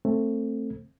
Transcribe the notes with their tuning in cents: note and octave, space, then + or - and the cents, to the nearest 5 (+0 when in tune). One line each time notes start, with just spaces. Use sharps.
A3 +20 C4 +15